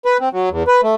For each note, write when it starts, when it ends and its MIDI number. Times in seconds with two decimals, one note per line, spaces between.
0.05 0.17 71
0.20 0.29 60
0.33 0.49 54
0.50 0.63 40
0.67 0.81 71
0.83 0.95 57